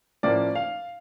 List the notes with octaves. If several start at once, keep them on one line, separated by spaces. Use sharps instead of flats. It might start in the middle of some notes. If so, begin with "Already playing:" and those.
A2 F3 A#3 C#4 D5
F5